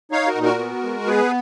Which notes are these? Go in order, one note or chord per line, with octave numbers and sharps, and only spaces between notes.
D#4 C#5 F5
F#4 A#4
A#2
F#4 A#4
B3
G#3
B3 G#4 B4